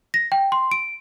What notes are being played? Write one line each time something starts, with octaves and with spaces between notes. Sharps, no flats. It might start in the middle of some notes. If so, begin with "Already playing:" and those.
A#6
G5
C6
D7